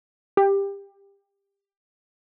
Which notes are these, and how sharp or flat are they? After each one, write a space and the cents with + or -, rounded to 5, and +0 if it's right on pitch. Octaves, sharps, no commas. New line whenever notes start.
G4 +20